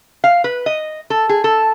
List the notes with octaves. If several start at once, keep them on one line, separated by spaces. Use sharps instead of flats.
F5
B4
D#5
A4
G#4
A4